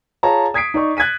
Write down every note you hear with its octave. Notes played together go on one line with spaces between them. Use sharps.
F4 G#4 C#5 F5 A5 A#5
D#6 G#6 B6 C7 D7
D#4 D5 C#6
F#6 G#6 A6 B6 D#7